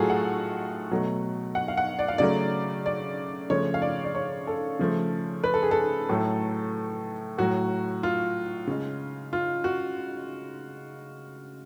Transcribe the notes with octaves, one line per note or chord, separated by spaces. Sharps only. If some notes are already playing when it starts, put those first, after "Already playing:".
Already playing: A2 F#3 A3 F4 F#4 G#4 A4
F#5
B2 F#3 A3
F#5
F5
F#5
D5
F5
C#3 F#3 A3 D5
D5
C#3 F3 A3 C#5
F5
D5
D5
C#5
A4
C#3 F3 A3
B4
A4
G#4
A4
A2 F#3 A3
A2 F#3 A3 F#4
F4
C#3 G#3
F4
F#4